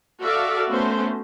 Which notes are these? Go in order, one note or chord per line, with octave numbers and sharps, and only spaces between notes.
F#4 A4 D5 E5 F5
A3 B3 C#4 F#4 C5